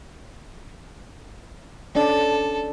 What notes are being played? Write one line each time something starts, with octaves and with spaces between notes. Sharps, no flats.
C#4 D4 A4 D5